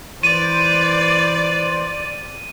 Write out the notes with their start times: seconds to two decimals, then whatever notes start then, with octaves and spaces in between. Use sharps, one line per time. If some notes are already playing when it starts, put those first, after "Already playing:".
0.23 E3 B4 C5 D5 D#7